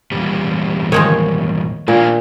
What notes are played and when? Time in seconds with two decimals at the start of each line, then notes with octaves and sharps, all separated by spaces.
0.12 E2 A#2 G3
0.92 D#3 F3 G#3 C#5
1.88 A#2 A#3 D4